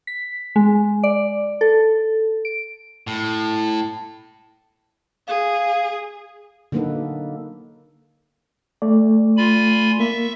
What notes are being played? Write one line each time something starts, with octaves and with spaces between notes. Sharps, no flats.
B6
G#3
D5
A4
D7
A2
G#4 F5
D3 F#3 A#3 D#4 A4 B4
A3 D5
F4 G#5 B5
A#3 E5 C#6